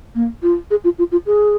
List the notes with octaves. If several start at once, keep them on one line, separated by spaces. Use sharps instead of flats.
A#3
F4
G#4
F4
F4
F4
G#4